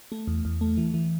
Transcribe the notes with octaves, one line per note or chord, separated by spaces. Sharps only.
A3
E2
E2
A3
E3
E3